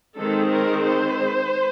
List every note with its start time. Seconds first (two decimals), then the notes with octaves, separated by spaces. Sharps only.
0.16 D#3 G#3 C4 A4
0.51 A#4
0.83 C5